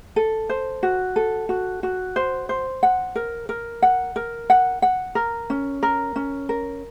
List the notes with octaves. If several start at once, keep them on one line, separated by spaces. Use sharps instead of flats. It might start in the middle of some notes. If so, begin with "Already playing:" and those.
A4
C5
F#4
A4
F#4
F#4
C5
C5
F#5
A#4
A#4
F#5
A#4
F#5
F#5
A#4
C#4
A#4
C#4
A#4